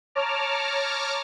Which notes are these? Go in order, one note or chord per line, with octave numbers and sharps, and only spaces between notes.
C#5 A5 A#5 D6 F6